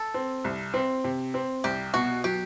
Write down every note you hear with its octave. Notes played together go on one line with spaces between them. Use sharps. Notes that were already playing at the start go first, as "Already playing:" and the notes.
Already playing: A4
C4
C2
C4
C3
C4
C2 G4
B2 F#4
F#3 G4